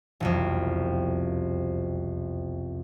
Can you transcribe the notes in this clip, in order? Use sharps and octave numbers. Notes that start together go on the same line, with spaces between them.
E1 C2 F2